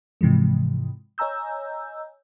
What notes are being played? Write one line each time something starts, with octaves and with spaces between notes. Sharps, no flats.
G#2 C3 E3 F3 G#3
C#5 D#5 G#5 A#5 E6 G6